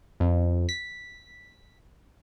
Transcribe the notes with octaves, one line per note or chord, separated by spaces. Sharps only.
F2
B6